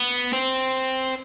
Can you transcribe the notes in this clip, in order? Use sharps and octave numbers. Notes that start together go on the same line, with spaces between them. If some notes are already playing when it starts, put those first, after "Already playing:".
Already playing: B3
C4